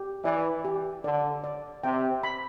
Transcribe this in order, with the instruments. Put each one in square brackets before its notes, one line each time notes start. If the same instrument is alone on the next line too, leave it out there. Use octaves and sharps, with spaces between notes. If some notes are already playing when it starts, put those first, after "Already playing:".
Already playing: [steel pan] G4
[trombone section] E3 [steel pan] D5
[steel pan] G4
[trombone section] D3 [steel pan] D5
[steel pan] D5
[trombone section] C3 [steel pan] G5
[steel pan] B5